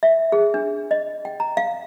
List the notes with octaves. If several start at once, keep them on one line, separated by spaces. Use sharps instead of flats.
E5
G#4
D4
D#5
G5
A#5
F5